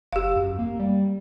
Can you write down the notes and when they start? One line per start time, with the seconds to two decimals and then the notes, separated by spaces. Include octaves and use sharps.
0.13 F#1 G4 F5
0.36 F#2
0.59 A#3
0.79 G3